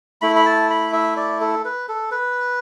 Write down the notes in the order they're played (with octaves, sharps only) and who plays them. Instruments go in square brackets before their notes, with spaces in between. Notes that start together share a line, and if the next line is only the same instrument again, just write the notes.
[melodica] A3 E4 B5
B5
A5
B5
E5
D5
A4
B4
A4
B4